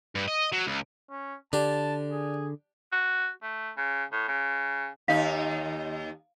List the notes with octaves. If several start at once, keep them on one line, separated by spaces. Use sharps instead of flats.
G2
D#5
F#3
C#2
C#4
D3 D4 G4 A5
G#4
F#4
A3
C#3
A2
C#3
D#2 D#4 F5